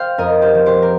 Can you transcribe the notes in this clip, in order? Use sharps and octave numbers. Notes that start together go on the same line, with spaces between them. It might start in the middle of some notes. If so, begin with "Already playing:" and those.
Already playing: C5 F5 G5
F2 A#4 D#5
G4 C5
F3
G4 C5
A#4